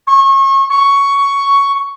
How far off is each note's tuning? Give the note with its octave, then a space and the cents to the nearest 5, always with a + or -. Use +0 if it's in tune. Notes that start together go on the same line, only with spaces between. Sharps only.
C#6 -30
C#6 +10